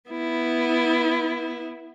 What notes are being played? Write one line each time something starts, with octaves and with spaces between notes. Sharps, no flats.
B3 E4